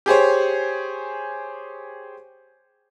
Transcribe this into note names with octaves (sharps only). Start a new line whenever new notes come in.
G4 G#4 C5 C#5